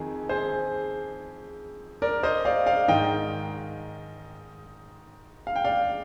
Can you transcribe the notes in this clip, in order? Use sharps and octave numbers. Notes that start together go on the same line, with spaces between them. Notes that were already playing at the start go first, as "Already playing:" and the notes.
Already playing: F2 D#3 G#4
G#4 C5
A#4 D5
C5 D#5
D5 F5
D5 F5
G#2 D#3 D#5 G5
F5
G5
D5 F5